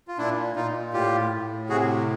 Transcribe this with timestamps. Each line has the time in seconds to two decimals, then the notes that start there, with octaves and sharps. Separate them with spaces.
0.08 F4
0.18 A#2 D4 E4
0.56 A#2 D#4 F4
0.93 A2 F4 G4
1.32 A2
1.69 C3 F#4 G#4